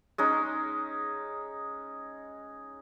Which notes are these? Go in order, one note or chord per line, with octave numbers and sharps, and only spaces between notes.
G#3 C#4 D#4